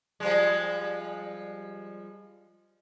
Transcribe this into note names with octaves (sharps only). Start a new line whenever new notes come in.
F3 G3 G#3